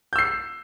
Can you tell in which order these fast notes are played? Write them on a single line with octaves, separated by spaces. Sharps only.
G6 E6 C7